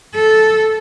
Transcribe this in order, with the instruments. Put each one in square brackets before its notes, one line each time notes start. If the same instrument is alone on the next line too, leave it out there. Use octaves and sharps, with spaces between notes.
[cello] A4